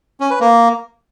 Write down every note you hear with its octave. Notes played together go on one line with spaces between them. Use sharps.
C#4
B4
A#3